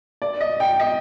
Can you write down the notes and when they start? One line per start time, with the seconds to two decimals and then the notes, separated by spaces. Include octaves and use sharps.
0.22 D5
0.41 D#5
0.60 G5
0.80 D#5